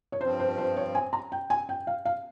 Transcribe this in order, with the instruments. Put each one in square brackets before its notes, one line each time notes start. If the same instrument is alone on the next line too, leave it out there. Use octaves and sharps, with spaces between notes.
[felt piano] C#5
[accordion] G2 F3 C4 [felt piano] C5
[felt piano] C5
C5
C#5
G#5
A#5
G5
G#5
G5
F5
F5